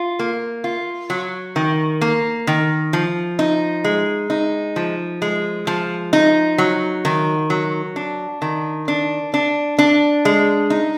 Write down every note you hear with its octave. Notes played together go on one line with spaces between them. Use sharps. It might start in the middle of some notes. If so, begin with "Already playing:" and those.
Already playing: F4
A#3
F4
F#3
D#3
A#3
D#3
F3
D#4
G#3
D#4
F3
G#3
F3
D#4
F#3
D#3
F#3
D4
D#3
D4
D4
D4
G#3
D#4